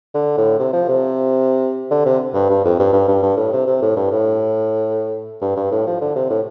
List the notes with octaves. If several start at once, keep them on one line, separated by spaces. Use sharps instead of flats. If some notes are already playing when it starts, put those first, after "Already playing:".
D3
A2
C3
F3
C3
D3
C3
G2
G2
F2
G2
G2
G2
G2
A2
C3
C3
A2
G2
A2
G2
G2
A2
F3
D3
C3
A2